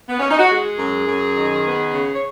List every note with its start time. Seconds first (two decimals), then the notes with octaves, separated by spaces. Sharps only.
0.09 B3
0.19 C#4
0.30 D#4
0.39 F#4
0.50 G#3 G#4
0.79 F#2
1.08 F#2
1.36 D#3
1.65 B3
1.93 C#3
2.15 C#5